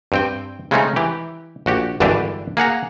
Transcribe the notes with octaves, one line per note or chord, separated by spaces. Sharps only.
G2 C4 G5
C#3 G#3 A3 C4 C#4 D#4
E3 G4
A#1 F#4 G4
G#1 G2 D3 E3 D4 G4
A#3 G#4 F#5 A#5